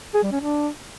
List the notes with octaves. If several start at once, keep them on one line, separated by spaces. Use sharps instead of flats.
G#4
G3
C#4
D4